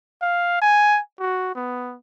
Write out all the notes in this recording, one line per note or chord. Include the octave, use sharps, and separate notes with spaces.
F5
G#5
F#4
B3